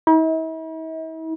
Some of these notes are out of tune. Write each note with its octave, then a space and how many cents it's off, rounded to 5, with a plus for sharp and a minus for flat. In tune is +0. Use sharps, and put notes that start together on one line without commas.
E4 -45